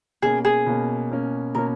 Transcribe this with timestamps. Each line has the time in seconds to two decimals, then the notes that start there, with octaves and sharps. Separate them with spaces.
0.22 B2 A#3 C#4 G#4
0.45 G#4
0.66 B2 A#3 C#4
1.10 B2 A#3 C#4
1.55 B2 A#3 C#4 A#4